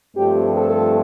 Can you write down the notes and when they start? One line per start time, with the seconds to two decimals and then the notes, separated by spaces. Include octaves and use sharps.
0.15 G2 F3 A3 C4 G4
0.54 A4